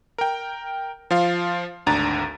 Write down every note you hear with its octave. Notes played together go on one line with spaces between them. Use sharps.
A#4 G5
F3 F4 F5
G#1 D2 D4 A#5 A6